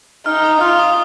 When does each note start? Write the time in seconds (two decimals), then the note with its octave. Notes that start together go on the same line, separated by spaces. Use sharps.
0.26 D#4 F6
0.44 D#6
0.61 F4 F6
0.79 D#6